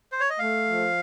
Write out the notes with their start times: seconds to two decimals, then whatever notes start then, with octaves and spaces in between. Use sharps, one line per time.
0.12 C5
0.20 C#5
0.30 D#5
0.39 A3 F5
0.67 F3